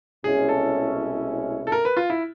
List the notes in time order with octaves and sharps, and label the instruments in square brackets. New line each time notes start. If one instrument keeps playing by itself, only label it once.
[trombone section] C2 B2 G#3 C#4 E4 [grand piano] G#4
[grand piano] A4
A4
A#4
B4
F4
E4